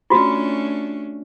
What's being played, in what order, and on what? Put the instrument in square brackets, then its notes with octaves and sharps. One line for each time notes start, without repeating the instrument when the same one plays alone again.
[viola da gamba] A3 C#4 D4 [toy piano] F4 F#4